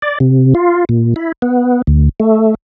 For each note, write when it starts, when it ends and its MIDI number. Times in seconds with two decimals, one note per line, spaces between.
0.02 0.18 74
0.20 0.54 48
0.55 0.85 65
0.89 1.14 46
1.16 1.32 64
1.42 1.82 59
1.87 2.09 38
2.20 2.55 57